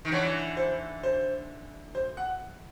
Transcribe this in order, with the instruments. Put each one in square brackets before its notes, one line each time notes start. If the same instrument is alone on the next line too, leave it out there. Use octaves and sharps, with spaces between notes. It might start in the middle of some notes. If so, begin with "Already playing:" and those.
[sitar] D#3
[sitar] D3 E3 [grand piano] C#5
[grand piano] C5
C5
C5
F#5